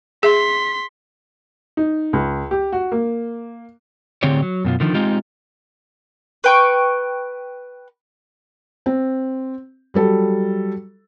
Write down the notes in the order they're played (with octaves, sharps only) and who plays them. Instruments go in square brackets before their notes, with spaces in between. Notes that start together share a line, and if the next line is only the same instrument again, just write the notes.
[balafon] G#4 E5 [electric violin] C6 B6
[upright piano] D#4
C#2
G4
F#4
A#3
[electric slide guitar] A2 D3 C4 G4 G#4 C#5
F#3
F#2 B2 F4
D3 D#3 F3
G#3 C4 D#4 F4 G4
[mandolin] B4 G5 C#6
[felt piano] C4
F#3 G3 A4